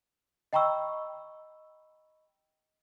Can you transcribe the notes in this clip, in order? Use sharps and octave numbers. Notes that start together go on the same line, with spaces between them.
D#5 G5 A#5 B5 C#6 E6